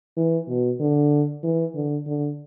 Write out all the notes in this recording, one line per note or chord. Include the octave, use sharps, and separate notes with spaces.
E3
B2
D3
E3
D3
D3